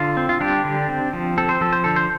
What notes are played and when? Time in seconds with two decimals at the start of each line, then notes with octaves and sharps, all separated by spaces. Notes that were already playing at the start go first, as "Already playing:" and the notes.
Already playing: D3 F4
0.17 C4
0.29 F4
0.41 G3 D4 G4
0.65 D3
0.89 C4
1.13 F3
1.38 C4 A4
1.49 C5
1.61 F3 A4
1.73 C5
1.84 D3 A4
1.96 C5